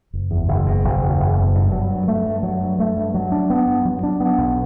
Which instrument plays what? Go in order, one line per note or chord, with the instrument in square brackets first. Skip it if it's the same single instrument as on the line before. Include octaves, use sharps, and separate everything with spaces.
[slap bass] F#1
E2
F#1
B2
F#1
E2
F#1
B2
G2
F#3
G2
A3
G2
F#3
G2
A3
G2
F#3
D4
B3
G2
F#3
D4
B3
B1